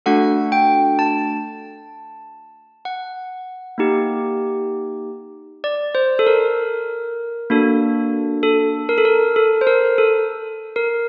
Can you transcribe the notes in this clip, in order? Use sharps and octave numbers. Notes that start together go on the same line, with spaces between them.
A3 D4 F#4 A4 F#5
G5
A5
F#5
A#3 D#4 G4
D5
C5
A4
A#4
A#3 D4 F#4 A4
A4
A#4
A4
A#4
A4
C5
A#4
A4
A#4